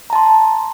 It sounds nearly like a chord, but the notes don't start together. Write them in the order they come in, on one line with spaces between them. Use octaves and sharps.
A#5 A5 C6